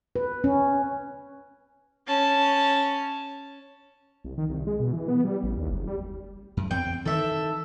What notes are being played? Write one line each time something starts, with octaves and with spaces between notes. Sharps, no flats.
B4
C#4
C#4 A5
C2
D#3
C2
G#3
B2
E3
B3
G3
A1
D#2
F#1
G3
F#2
E2 C4 G5
D#3 E3 A4 E5